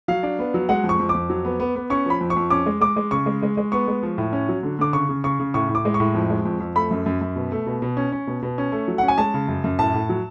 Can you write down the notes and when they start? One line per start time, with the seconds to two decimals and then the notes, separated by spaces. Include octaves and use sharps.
0.08 F#3 F5
0.23 D4
0.39 B3
0.54 F#3
0.69 G#3 F#5
0.84 F2
0.89 C#6
0.99 F2
1.09 D6
1.14 F2
1.30 F#3
1.45 B3
1.60 B3
1.76 B3
1.90 C#4 C#6
2.06 F3 B5
2.21 F2
2.30 C#6
2.36 F2
2.50 C#4 D6
2.66 G#3
2.81 G#3 D6
2.96 G#3
3.11 C#3 C#6
3.26 G#3
3.43 G#3
3.57 G#3
3.72 B3 C#6
3.88 G#3
4.03 F3
4.18 A2
4.33 C#4
4.49 F#3
4.63 D3
4.79 D3 D6
4.93 C#3 C#6
5.09 C#3
5.24 C#3 C#6
5.39 C#3
5.54 A2 C#6
5.69 A2
5.75 D6
5.85 G#3
5.94 C#6
6.00 A2
6.14 F2
6.30 G#3
6.45 F2
6.60 F2
6.75 A3 B5
6.91 F#2
7.06 F#2
7.21 F#2
7.36 B2
7.52 A3
7.66 B2
7.82 B2
7.97 C#4
8.12 C#4
8.27 B2
8.42 B2
8.58 C#4
8.72 A3
8.88 F#3
8.98 C#4 F#5
9.08 G#5
9.18 G#3 A5
9.34 C#3
9.48 F#2
9.64 F#2
9.79 A2 A5
9.94 A2
10.09 F#3